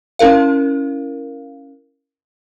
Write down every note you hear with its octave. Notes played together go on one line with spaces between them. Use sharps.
C#4 E4 A#4 F5